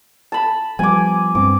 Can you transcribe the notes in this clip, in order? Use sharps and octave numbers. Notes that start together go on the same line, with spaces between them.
A5 B5
F3 G3 B3 G#5 D6
G2 B3 C4 D6